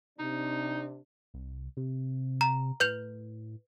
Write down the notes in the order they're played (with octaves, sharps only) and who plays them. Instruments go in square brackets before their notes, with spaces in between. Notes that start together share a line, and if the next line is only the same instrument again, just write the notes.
[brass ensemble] C3 D4 [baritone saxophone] D#4
[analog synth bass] C2
C3
[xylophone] A#5
[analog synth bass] A2 [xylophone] B4 G6 F7